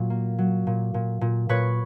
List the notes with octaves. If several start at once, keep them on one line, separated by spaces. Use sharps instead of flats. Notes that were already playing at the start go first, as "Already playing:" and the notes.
Already playing: A#2 F#3
A#3
F#3
A#2
A#2
A#2
A#2 B4 C#5